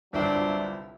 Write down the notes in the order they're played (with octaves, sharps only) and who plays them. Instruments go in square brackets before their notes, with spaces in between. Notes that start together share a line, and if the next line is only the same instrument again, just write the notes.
[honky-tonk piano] G1 C2 E5 [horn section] F#3 C4 D4